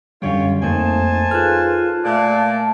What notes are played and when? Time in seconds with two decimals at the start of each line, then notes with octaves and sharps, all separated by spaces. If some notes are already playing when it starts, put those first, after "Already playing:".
0.22 F#2 D3 G3 F4 G4 C#5
0.63 F2 A3 A#3 D#4 C5 G#5 A5
1.31 F4 G#4 A4 B4 F6 F#6
2.05 A#2 A3 D5 E5 A5